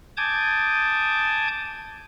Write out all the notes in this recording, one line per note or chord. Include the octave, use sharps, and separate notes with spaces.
G#5 A5 D6 D#6 G6 G#6